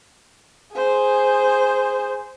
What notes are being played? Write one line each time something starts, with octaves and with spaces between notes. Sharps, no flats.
G#4 C5